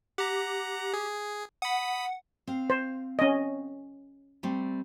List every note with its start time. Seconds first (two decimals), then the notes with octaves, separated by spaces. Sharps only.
0.18 G4 F#5 A#5
0.94 G#4
1.62 F#5 B5 D#6
2.47 C4 F5
2.70 C5
3.19 C#4 D#5
4.43 G3 A3 C4